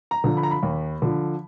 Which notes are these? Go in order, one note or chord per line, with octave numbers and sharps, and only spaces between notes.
A#5
D3 F3
B5
A#5
B5
D#2
D3 F3